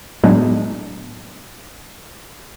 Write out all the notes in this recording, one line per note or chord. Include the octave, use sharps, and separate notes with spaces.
A2 F#3 G#3 B3 D4 D#4